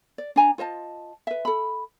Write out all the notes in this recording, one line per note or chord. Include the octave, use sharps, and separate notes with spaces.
D5
D4 G#5 A#5
F4 C5 D#5 A5
B4 E5
A4 B5